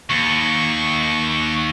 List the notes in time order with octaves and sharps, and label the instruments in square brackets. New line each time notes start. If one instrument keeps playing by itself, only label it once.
[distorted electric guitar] D#2 [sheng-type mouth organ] C#6